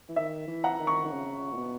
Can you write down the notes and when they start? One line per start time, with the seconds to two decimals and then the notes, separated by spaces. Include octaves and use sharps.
0.09 E3
0.16 D#3 E5
0.48 E3
0.64 F#5 A#5
0.79 D#3
0.87 A#5 C#6
1.05 D#3
1.11 C#3
1.52 A#2
1.57 B2